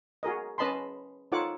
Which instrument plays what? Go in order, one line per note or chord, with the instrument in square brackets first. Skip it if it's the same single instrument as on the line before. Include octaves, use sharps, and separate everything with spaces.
[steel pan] F#4 G#4 A#4 D#5
C#4 B4 D#5 A5 B5 C6
D#4 F4 A4 C#5 F#5 D6